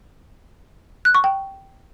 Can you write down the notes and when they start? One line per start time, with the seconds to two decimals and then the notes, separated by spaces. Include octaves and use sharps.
1.05 F#6
1.15 C#6
1.24 G5